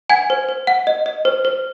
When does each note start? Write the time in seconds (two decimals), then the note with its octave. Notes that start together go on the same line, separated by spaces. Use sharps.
0.10 F#5 G#5 G#6
0.30 C5
0.49 C5
0.67 F#5
0.87 D#5
1.06 D#5
1.25 C5
1.45 C5